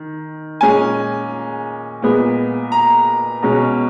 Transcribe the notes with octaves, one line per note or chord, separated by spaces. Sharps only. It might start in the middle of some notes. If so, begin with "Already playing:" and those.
Already playing: D#3
A#2 G#3 C#4 G#5
A#2 G#3 B3
A#5
B2 G#3 C#4